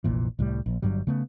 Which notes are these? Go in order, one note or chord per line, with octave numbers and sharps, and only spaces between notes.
F1 A#1 A#2 E3
C2 A2 E3 G3
A#1
G1 G2 F#3 G3
C#3 A3 B3